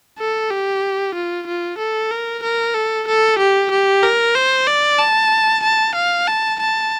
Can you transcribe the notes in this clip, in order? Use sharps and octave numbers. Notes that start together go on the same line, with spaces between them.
A4
G4
F4
F4
A4
A#4
A#4
A4
A4
G4
G4
A#4
C5
D5
A5
A5
F5
A5
A5